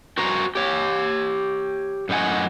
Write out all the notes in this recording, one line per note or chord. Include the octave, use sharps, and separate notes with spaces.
F#4 A#4 C5 A#5
G4 C#5
F#2 A2 D#4 F#5 G#5